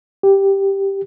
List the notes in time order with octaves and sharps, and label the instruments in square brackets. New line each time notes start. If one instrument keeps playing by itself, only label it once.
[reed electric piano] G4